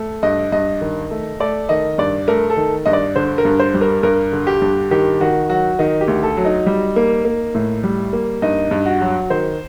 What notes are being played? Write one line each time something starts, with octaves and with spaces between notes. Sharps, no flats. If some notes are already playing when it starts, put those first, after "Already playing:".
Already playing: A3
G2 D#5
G2 D#5
D#3
A3
A3 D5
D#3 D#5
G2 D5
A3 A#4
A4
D#3
G2 D#5
D5
D3 C5
A#4
G2
C5
G3
A#4
G2 A#4
D3
G4
G2
D#3 G4
D#3 F#4
F#3 F#4
D#3 D#4
G4
D2
A4
F#3
D#4
G3
A#3
A#3
A2
G3
A#3
G2 D#4
G2
F#4
F#3
D#3 C5